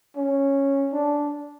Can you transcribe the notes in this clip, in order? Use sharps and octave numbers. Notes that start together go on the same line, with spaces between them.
C#4
D4